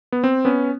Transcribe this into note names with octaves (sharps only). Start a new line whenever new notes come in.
B3
C4
B3 C#4